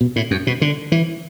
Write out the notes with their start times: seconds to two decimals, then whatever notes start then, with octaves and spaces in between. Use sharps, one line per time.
0.01 B2
0.16 A2
0.31 F#2
0.47 B2
0.61 D3
0.92 E3